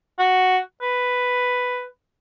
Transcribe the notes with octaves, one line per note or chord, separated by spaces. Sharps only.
F#4
B4